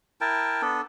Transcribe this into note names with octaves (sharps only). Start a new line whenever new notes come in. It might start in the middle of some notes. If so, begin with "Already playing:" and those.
E4 A#4 G5 A5
B3 D4 A4